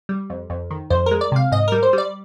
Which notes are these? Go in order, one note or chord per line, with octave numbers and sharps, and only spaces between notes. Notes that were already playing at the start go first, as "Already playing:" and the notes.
G3
F2
F2
D#3
F2 C5
G#3 A#4
D5
C3 F5
G#2 D#5
G3 A#4
C5
G3 D5